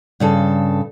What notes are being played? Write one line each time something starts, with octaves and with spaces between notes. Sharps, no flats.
G2 C#3 A4